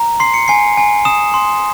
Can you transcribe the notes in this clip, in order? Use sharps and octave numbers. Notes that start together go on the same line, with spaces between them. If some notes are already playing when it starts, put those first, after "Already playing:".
Already playing: A#5
C6 C7
C#7
G#5 C7
G#5
D#6 E7
C6